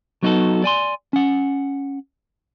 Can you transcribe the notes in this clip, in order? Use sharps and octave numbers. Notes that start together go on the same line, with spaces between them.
F#3 B3 D#4 F4 F#4 A4
D5 G#5 C6
C#4 F#5